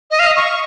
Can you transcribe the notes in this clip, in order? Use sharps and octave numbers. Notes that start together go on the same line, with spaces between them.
D#5
F5
D#5
C#6